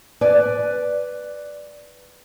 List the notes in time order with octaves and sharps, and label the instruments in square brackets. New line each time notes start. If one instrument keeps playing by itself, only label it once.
[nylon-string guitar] B4 D5 G#5